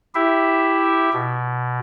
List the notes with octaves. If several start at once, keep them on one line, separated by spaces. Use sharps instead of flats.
E4 G4 E5
B2